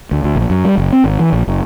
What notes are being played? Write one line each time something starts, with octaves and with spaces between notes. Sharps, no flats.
D2
D2
A#1
F#2
G3
F#1
C4
G#1
E3
A#1
F#1